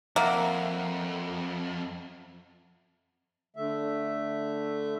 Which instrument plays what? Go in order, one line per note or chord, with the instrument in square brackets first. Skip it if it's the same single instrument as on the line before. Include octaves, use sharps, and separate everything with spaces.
[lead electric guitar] F2 [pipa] A#3 [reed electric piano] E5 F#5 A#5
[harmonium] D3 A3 E5